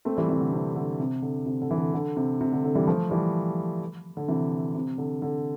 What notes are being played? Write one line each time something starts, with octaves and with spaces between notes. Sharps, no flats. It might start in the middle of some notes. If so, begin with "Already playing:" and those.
A3 C4
E3 G3
C3 E3
D3
C3
D3
C3
D3
C3
D3
E3
D3
D3
C3
C3
D3
D3
E3 G3
F3 A3
E3 G3
D3
C3 E3
C3
D3
D3